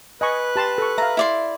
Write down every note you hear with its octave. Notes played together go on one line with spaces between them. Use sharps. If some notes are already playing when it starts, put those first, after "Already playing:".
B4 D#5 G#5 C#6 F#6
G4 A5 C6
A4 C#6
E5 F5 A#5
E4 D5 C6